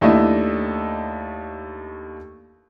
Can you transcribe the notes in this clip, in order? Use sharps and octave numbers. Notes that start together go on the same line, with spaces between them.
D#2 A3 D4 E4 D#5